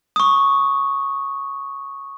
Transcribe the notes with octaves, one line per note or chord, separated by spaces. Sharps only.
C#6 D#6